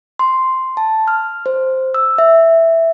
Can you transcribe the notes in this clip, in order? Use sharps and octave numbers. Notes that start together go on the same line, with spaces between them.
C6
A5
F6
C5
E6
E5